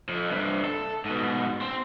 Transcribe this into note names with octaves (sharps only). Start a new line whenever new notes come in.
F2
G2 C3
A4
G#2 B2
C4